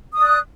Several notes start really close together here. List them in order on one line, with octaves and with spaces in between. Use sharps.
D#6 D5 F#6